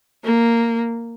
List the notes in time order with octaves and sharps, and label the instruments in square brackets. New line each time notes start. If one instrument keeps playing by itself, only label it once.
[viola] A#3